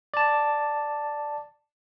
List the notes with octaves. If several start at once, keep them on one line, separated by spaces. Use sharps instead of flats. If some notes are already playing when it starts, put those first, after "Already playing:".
D5 A5